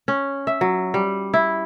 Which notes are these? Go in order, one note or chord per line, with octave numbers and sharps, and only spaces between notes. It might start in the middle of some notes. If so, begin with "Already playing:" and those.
C#4
E5
F#3
G3
E4